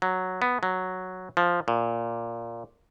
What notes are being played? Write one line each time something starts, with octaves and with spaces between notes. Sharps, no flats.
F#3
B3
F#3
F3
A#2